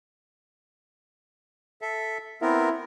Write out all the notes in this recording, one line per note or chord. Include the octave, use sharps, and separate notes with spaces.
A4 E5
B3 C4 E4 A#4